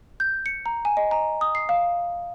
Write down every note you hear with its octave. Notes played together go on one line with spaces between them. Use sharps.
G6
C#7
A#5
G#5
D#5
A#5
D#6
C7
F5